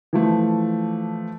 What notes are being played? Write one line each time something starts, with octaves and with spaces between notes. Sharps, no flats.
E3 F3 A3